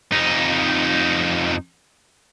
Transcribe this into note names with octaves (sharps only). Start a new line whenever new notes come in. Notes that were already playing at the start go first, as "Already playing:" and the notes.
F2 D#4